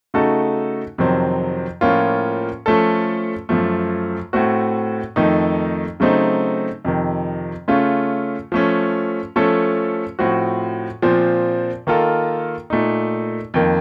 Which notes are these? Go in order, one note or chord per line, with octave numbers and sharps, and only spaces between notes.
C#3 A3 D#4 F#4 A4
F2 C3 D#3 F#3 C4
A2 F3 A#3 C#4 F4
F3 A3 C#4 A4
F#2 F3 A3
A2 A3 C4 F#4
F2 D#3 A3 D#4
C#3 F#3 A3 C4 D#4
F2 C3 D#3
C#3 A3 C#4 F4
F3 A3 C#4
F3 A3 C#4 A4
A2 F3 C4 F#4
A#2 F3 C4
D#3 A#3 F4 A4
A#2 A3 D#4
F2 D#3 A#3